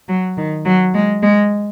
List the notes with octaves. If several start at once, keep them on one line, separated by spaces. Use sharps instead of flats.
F#3
D#3
F#3
G#3
G#3